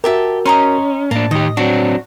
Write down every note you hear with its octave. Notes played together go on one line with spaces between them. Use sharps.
F#4 G4 A#4 E5 A5
C#4 D#5 A#5 C6
A2 A#3 D4 A5
D#3 G4 D#5
F#3 C4 D4 F#4